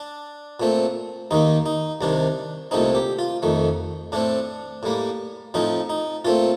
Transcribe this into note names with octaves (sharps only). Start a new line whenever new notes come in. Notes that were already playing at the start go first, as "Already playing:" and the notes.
Already playing: D4
A#2 A3 C4
D#2 D#3 A#3 D#4
D#4
C2 C3 D#3 D4
C2 A#2 A3 C4 D#4
G4
F4
F2 D#3 A3
A2 A3 C4 D4
A2 G3 A#3
A2 F3 C4 D#4
D#4
A#2 A3 C4 F4